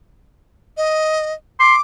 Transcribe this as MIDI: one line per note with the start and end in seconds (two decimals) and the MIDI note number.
0.77 1.33 75
1.60 1.75 84
1.60 1.81 86